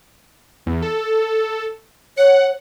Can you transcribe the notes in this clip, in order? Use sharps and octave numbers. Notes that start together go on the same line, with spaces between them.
E2
A4
C#5 F#5